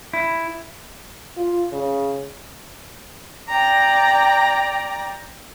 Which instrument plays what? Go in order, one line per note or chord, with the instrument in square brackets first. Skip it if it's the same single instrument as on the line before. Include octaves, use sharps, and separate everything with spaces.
[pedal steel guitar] E4
[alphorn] F4
C#3
[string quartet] D5 G5 A#5